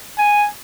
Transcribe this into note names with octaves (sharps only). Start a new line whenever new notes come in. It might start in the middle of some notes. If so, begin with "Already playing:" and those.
G#5